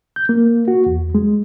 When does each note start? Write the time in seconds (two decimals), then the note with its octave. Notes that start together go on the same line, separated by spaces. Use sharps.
0.16 G6
0.29 A#3
0.68 F#4
0.86 E2
1.15 G#3